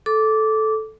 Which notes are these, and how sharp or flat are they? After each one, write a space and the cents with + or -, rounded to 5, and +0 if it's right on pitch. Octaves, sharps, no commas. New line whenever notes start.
A4 -10 D6 -10